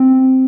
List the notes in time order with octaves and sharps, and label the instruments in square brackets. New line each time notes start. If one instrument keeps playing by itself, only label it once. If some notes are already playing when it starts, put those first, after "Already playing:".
Already playing: [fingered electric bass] C4